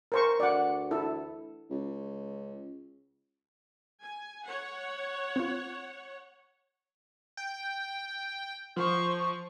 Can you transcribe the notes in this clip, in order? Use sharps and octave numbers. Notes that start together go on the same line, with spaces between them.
A#4 C5 C#6
D2 D5 F#5
E4 A4
C#2
G#5
C#5 F#5
C4 F4
G5
F3 C5 C#6